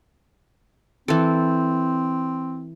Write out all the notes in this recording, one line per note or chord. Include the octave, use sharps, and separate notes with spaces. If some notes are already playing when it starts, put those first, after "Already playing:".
E3 C4 A4